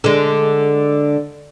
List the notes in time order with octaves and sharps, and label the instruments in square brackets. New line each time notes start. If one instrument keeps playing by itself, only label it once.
[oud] D3 G#3